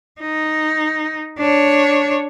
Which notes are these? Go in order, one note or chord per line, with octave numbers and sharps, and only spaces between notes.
D#4
D4 C#5